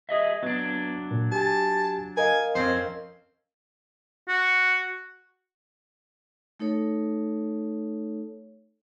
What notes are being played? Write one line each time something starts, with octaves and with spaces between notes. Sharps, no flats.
G#4 D#5 E5
F#3 B3 D4
A#2
G4 G#5 A5
A#4 D#5 F5 G#5
F2 C4 C#4 C5
F#4
A3 D#4 A4 C#5